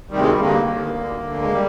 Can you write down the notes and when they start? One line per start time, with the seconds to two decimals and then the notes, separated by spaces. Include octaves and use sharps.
0.11 D2 C3 D#3 G3
0.21 G#3
0.31 G3
0.40 G2 D3 A#3
0.67 D#2 D#3
0.96 D2 D3
1.24 D2 D3
1.42 G#3
1.52 G3